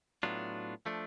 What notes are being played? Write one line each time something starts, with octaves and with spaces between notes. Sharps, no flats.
A2 F#3 B3 D4 F4
F3 A3 D4